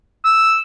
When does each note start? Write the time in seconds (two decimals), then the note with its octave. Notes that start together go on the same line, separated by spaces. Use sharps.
0.25 E6